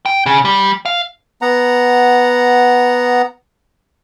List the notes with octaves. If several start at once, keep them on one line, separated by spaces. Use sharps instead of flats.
G5
C#3 G#4
G3
F5
B3 F#5 A#5